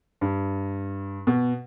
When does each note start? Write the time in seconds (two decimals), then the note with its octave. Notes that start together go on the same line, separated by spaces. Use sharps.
0.21 G2
1.27 B2